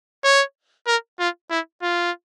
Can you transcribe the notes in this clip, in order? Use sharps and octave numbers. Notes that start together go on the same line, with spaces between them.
C#5
A#4
F4
E4
F4